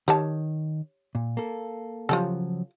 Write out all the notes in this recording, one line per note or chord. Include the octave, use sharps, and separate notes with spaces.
D#3 G4 C#5 A5
A#2
A#3 A4
C#3 F3 F#3 F4 G4 A4